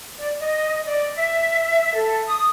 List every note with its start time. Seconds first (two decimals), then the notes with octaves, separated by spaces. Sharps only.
0.18 D5
0.39 D#5
0.85 D5
1.15 E5
1.94 A4
2.28 D#6